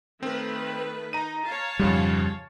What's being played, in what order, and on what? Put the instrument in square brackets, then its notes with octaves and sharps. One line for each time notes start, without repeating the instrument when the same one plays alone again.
[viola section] D#3 A3 B4 [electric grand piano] C4
[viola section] D#4 [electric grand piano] A#5 D#7
[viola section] C#5 F5 A5
[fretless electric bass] F2 G3 [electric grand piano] G#2 C#3 F3